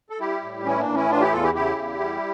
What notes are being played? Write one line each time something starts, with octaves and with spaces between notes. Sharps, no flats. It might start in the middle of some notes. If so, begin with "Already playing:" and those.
A4
G3 E4 G4
A2
E3 C#4 E4
A#3 D4
A2
C#4 E4
E3 D4 F4
E4 G4
E2 F4 A4
E4 G4
C#3 E4 G4
E2
G3